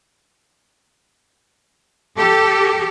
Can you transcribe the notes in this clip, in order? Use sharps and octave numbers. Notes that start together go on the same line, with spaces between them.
G4 A4